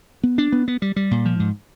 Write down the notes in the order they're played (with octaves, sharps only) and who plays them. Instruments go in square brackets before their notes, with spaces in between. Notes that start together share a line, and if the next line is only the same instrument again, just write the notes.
[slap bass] B3
D4
B3
B3
G3
G3
A#2
F3
G#2